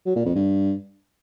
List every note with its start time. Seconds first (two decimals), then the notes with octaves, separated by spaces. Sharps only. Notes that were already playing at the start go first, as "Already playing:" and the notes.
0.06 F#3
0.15 A#2
0.25 F2
0.35 G2